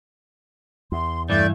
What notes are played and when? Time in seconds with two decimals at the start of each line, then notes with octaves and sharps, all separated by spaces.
0.92 E2 C6
1.30 G2 E3 A3 D5 G6